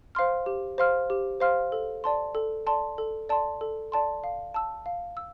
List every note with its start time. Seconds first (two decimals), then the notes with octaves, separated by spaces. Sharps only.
0.15 C5 F5 C6 F6
0.46 G4
0.78 C5 F5 C6 F6
1.10 G4
1.40 C5 F5 C6 F6
1.72 A4
2.04 D5 A5 C6
2.35 A4
2.67 D5 A5 C6
2.98 A4
3.29 D5 A5 C6
3.61 A4
3.92 D5 A5 C6
4.24 F5
4.54 A5 E6
4.86 F5
5.17 E6